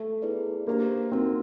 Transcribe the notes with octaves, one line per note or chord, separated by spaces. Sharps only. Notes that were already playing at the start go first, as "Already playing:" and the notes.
Already playing: A3
B3 E4 G#4 B4 D5
A#3 D4 G4 C5
C4 D#4 F#4 A#4